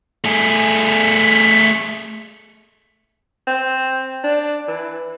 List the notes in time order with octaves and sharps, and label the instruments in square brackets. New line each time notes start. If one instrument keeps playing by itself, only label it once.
[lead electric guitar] A3 G#4
[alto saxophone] C4
D4
E3